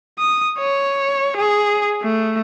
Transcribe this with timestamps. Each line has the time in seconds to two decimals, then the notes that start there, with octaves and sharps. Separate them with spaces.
0.19 D#6
0.59 C#5
1.37 G#4
2.03 A3